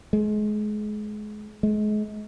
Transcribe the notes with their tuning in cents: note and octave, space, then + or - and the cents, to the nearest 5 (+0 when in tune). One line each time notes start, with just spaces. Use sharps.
G#3 +30
G#3 +35